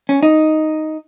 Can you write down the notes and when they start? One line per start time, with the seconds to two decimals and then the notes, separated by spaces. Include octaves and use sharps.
0.09 C#4
0.23 D#4